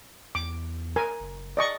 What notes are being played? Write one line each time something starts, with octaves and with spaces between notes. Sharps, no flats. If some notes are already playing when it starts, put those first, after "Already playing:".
E2 D6
A#4 G#5
F#1
D5 D#5 C#6